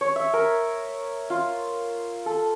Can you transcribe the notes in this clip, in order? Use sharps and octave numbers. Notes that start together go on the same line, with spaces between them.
C#5
E5
A#4
F4
A4